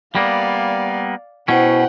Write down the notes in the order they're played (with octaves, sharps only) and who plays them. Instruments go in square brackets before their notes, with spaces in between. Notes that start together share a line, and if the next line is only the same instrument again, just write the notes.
[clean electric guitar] G3 A#3 B3 [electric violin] D5 F5
[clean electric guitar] B2 C#4 [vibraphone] E4 C5 [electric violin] F#5 G5